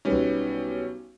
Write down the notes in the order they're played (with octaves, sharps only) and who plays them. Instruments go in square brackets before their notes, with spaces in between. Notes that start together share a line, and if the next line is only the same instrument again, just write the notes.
[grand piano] B1 B3 D#4 [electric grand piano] G3 C#4